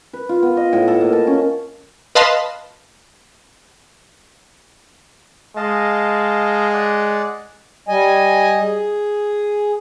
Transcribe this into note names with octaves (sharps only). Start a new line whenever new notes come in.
B4
F4
B3
D#5
A2
A4
A#3
A5
C#4
B4 D#5 F5 A5 B5 C6
G#3 D#5 F5 A5
D5 F#5
G3 D#5 G#5
G#4